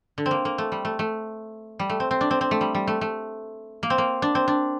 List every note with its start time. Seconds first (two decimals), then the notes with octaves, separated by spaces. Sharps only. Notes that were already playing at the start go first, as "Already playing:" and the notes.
0.18 D3
0.26 C4
0.31 A#3
0.45 A#3
0.58 A3
0.72 G3
0.85 A3
0.99 A3
1.79 G3
1.90 A3
2.00 C4
2.11 C4
2.21 D4
2.31 C4
2.41 C4
2.51 A3
2.61 G3
2.75 G3
2.87 A3
3.01 A3
3.83 A#3
3.90 C4
3.98 A#3
4.22 D4
4.35 C4
4.48 D4